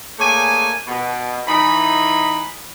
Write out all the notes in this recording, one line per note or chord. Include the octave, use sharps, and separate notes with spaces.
A3 A#3 G#4 C#5 D5 G#5
B2
E3 D#4 B5